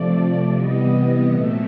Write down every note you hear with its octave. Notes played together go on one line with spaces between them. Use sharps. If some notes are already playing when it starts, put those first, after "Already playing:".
Already playing: C3 F3 A3 D5
C3 E3 G3 B3 D#5
A#2 F#3 A3 C4 E5